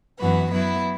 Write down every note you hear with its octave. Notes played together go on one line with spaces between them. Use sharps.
F#2 E3 B3 F#4 B4
F#3 B3 E4 B4